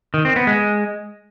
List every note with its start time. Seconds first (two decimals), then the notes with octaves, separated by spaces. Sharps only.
0.14 D#3
0.25 C4
0.36 B3
0.47 G#3